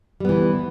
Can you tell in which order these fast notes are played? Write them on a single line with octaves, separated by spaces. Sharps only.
G3 B3 E3